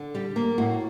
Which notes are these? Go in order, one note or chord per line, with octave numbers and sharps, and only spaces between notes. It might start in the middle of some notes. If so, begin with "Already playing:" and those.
Already playing: D3
G3 G4
A#3
A2 F#4